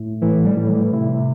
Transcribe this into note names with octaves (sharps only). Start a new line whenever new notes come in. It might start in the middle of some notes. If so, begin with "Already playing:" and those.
Already playing: A2 A3 E4
A2 E3
G3
A2
E3
C3 E4